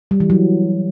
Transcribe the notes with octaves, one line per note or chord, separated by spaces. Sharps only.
G3
E3
F#3